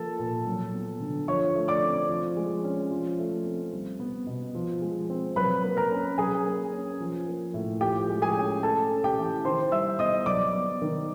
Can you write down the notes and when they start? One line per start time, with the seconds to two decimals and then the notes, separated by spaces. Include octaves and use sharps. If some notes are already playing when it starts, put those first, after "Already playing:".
Already playing: F3 A#3 A4 A5
0.19 A#2
0.47 F#3
0.73 B3
1.00 D3
1.28 F3 C#5 C#6
1.55 A3
1.68 D5 D6
1.83 C4
2.09 F3
2.36 G#3
2.64 C#4
2.91 F3
3.18 A3
3.45 C4
3.73 G3
4.00 B3
4.27 B2
4.55 F3
4.82 G#3
5.10 C4
5.36 F#3 B4 B5
5.63 A#3
5.77 A#4 A#5
5.91 C#4
6.18 F#3 G#4 G#5
6.45 A#3
6.73 C#4
7.00 F3
7.28 A#3
7.54 A2
7.81 F3 G4 G5
8.09 G#3
8.22 G#4 G#5
8.36 C#4
8.63 A3 A4 A5
8.90 C#4
9.04 G4 G5
9.18 E3
9.45 D#3 C5 C6
9.71 G3 E5 E6
9.99 B3 D#5 D#6
10.26 F#3 D5 D6
10.54 B3
10.82 D#3